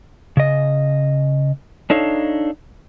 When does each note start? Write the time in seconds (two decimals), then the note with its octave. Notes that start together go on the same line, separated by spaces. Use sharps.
0.37 C#3 D#5
1.90 D4 D#4 A4 C#5 F5